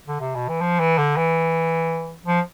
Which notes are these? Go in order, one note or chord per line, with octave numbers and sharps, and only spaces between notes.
D3
C3
B2
E3
F3
E3
D3
E3
F3